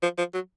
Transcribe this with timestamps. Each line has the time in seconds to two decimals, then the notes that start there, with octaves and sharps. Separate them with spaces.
0.03 F3
0.18 F3
0.34 F#3